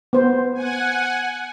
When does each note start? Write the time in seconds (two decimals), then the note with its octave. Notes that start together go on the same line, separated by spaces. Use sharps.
0.13 B3 C5
0.53 F#5 G#5